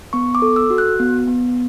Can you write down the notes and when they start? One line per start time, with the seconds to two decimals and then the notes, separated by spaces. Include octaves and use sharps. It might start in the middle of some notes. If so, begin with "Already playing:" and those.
0.13 B3 C#6
0.35 D6
0.42 A4
0.56 E6
0.70 F#4
0.78 F#6
1.00 B3
1.28 B3